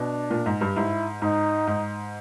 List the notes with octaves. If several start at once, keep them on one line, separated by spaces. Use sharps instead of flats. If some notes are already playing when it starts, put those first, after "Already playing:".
Already playing: B2 D4
A#2
G#2
G2
G#2 E4
G#2 D#4
G#2